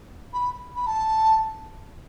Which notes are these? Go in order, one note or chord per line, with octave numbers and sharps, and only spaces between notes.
B5
B5
A5